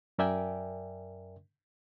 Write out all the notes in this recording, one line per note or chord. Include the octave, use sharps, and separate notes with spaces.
F#2 A#4 D5 E5 G5 G#5